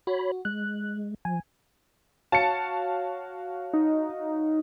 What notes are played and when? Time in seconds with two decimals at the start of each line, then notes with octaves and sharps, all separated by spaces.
0.07 F#4 C#5 B5
0.45 G#3 F#6
1.25 F3 G#5
2.32 F#4 C#5 F5 A5 C#7
3.73 D#4